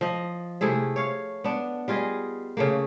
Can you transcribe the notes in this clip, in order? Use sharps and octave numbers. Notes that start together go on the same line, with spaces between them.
F3 D#5
C3 A3 E4 G#4
C#5 F5
B3 D4
G3 F4 G#4 D#5
C#3 A3 A#3